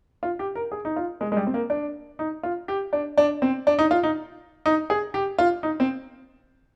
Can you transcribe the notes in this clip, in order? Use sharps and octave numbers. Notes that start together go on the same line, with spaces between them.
F4
G4
A#4
G#4
D#4
F4
G#3
G#3
G3
C4
A#3
D4
D#4
F4
G4
D4
D4
C4
D4
D#4
F4
D#4
D#4
G#4
G4
F4
D#4
C4